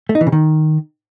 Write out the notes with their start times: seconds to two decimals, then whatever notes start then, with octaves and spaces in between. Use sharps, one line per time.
0.09 A3
0.15 D#4
0.21 E3
0.27 C#3
0.32 D#3